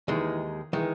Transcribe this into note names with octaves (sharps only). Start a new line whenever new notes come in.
D#2 D#3 E3 G#3
D#3 E3 G#3